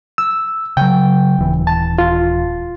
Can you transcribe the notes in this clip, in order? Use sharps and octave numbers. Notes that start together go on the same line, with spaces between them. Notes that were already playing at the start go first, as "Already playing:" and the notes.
E6
C#3 F#3 G5
D#1 E3
A5
F4